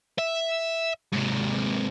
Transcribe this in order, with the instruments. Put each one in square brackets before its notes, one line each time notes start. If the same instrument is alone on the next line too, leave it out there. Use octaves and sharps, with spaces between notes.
[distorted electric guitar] E5
G#2 C3